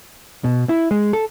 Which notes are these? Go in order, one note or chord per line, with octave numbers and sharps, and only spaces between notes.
B2
E4
G#3
A4